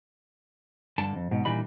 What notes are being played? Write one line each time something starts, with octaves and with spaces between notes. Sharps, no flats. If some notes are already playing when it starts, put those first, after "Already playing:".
G2 D3 A5
F2
G#2 B2
A#2 E3 G3 D4 D#4 B5